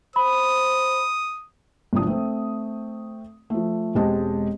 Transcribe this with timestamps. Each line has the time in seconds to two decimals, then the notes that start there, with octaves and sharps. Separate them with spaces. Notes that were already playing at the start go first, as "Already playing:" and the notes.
0.16 C5 B5 D#6
1.93 G#1 C3 F3 D4 D#6
2.07 A3 C4
3.50 F3 A3
3.95 E1 G#3 C4 G4 D#5 A5